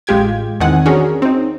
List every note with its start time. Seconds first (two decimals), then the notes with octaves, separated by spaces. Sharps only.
0.07 A1 G#3 F4 G4 G5 G#6
0.60 E2 D#3 C4 F#5 G#5
0.86 C#4 D4 F#4 G#4 A#4
1.22 C4 D#4